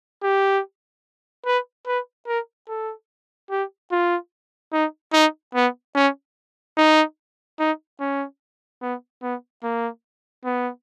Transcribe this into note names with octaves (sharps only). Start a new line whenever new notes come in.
G4
B4
B4
A#4
A4
G4
F4
D#4
D#4
B3
C#4
D#4
D#4
C#4
B3
B3
A#3
B3